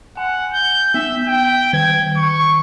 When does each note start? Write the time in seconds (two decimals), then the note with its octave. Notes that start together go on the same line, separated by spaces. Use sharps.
0.17 F#5 G#5
0.53 G6
0.94 B3 E5
1.27 G5
1.73 D#3 G#6
2.17 C#6